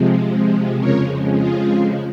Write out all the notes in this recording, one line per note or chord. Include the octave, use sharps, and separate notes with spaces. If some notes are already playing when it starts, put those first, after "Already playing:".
Already playing: C3 F3 G#3
F2 C#3 F3 G#3 A#4 C#5
F4 G#4